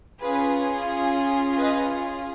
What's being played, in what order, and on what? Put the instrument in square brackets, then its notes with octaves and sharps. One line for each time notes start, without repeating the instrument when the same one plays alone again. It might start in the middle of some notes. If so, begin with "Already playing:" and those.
[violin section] C#4 F4 G#4 B4
B4 D#5